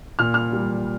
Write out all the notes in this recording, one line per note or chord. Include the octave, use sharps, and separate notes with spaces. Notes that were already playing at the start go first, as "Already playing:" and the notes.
A#2 F6
F6
G3